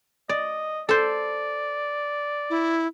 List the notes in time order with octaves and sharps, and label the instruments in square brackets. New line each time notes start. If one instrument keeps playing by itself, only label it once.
[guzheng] D5 [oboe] D#5
[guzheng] A4 C5 [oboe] D5
[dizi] E4